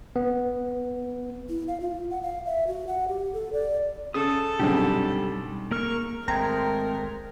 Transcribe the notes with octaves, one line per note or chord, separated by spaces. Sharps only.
B3
E4
F5
F4
F#5
F5
E5
F#4
F#5
G4
A4
D5
C#3 A4 D#6
C2 F#2 B2 D3 G3 D#4 G4 G#4
A#3 A#4 C#6 F6
G#1 G#3 A3 C4 A#4 G5 A#5 G#6